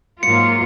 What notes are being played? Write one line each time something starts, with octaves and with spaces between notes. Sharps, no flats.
G#2 F#3 A#3 F4 C#7